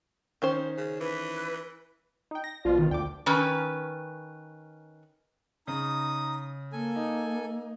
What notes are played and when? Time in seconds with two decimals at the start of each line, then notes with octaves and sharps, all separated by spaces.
0.42 D#3 C#4 C5
0.77 C#3
1.00 E3 B4
2.31 D#4 G5
2.44 A#6
2.65 A#1 B2 F3 F4 D5
2.79 D#3
2.91 D2 G5 D6
3.26 D#3 C#4 B4
5.67 C#3 D#4 D#6
6.72 A#3 A4 G#5
6.95 D#4